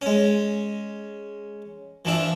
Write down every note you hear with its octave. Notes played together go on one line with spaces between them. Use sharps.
G#3 C#4
E3 F3 D4 E5